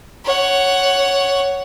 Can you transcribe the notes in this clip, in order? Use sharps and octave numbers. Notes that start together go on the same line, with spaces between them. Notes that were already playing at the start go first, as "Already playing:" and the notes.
C#5 F#5